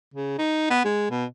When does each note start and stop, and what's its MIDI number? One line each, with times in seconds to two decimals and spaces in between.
0.14 0.34 49
0.38 0.66 63
0.70 0.83 59
0.84 1.10 56
1.10 1.25 47